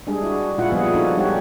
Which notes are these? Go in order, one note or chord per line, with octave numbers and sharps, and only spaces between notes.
G3 G#3 D4 G#4
E4 F#4
A#2 G#3 E4 F4 F#5
F3 G3 B3 G#4
D4 D#4 F#4 A4
G3 G#3 D#4 G4 C#5 F#5